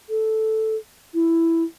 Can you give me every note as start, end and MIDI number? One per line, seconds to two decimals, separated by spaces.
0.09 0.75 69
1.14 1.63 64